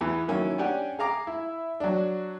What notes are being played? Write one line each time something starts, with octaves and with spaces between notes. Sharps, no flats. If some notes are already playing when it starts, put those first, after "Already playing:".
E2 E3
D#3 F#3 A#3 C#4 E4
C#4 D4 G4 F#5 G#5
G#4 F5 A#5 D6
E4
F#3 D4